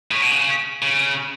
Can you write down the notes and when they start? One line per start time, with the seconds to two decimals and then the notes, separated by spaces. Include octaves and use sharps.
0.11 A2
0.22 B2
0.31 C#3
0.82 C#3